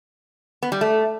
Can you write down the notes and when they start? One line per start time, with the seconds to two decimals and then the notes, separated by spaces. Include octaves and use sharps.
0.63 B3
0.72 G3
0.81 A3